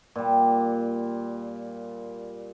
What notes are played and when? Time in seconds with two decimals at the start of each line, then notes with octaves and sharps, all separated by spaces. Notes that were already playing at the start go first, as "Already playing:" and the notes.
0.15 A#2 G3